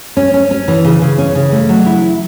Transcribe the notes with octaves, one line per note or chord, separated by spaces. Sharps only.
C#4
C#4
C#4
E3
C#3
C#3
C#4
C#3
A3
F#3
E4